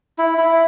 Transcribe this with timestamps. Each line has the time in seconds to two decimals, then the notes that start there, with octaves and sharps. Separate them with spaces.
0.18 E4
0.38 E4